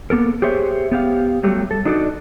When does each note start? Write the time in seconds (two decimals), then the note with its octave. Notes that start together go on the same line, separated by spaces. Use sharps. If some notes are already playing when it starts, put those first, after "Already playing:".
0.10 A#3 B3 A4 A#4
0.42 G4 G#4 C5 C#5 E5
0.92 B3 G4 F5
1.43 F#3 G3 A3 G4
1.71 A4
1.85 D4 D#4 F#4 A4 C#5 D5